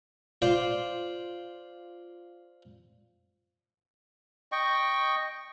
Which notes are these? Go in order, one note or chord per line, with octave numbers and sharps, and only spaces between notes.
F4 C5 D5
D#5 G5 C#6